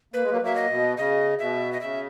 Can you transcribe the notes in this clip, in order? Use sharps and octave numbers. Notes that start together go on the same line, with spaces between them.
A#3 B4
G#3
F#3 A#3
F#3 A#3 E5
D#5
B2
C#3 D#5
B2 E5
D#5
C#3 E5